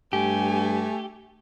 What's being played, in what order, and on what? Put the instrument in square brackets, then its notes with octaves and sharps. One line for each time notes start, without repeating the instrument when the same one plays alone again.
[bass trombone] G2 [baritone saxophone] A3 [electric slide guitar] G4 [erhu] G#5